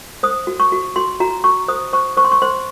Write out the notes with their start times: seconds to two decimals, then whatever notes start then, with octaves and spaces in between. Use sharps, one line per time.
0.23 C5 D#6
0.47 F#4
0.60 C#6
0.72 F#4
0.96 F#4 C6
1.20 F#4 A#5
1.44 F#4 C#6
1.68 C5 D#6
1.93 C5 C#6
2.17 C5 C#6
2.25 C6
2.32 C#6
2.42 C5 C6